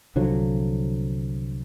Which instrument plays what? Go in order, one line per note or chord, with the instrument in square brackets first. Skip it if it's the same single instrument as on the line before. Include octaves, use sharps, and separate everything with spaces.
[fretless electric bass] C2 D3 F3 F#3